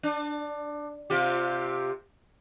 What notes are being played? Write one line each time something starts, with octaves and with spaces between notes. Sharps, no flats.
D4
C3 F4 G4